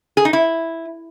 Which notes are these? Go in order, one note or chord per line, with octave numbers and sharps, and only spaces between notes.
G#4
D#4
E4